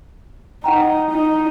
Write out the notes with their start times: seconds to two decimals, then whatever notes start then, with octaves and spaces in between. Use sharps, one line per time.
0.64 D#4 F#5 G5 A#5
1.10 D#4